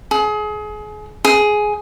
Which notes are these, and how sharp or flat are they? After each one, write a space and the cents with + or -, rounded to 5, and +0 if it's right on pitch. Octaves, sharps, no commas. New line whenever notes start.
G#4 +30
G#4 +10